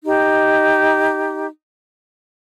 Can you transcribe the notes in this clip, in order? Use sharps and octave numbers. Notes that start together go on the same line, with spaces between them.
D#4 G4